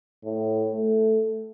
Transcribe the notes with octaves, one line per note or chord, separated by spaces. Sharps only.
A2
A3